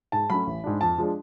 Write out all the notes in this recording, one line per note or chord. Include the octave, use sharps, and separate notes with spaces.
G#2 A5
F#3 A3 C#4 B5
A1
G#2 G#3 D4
F2 A5
F3 G#3 D4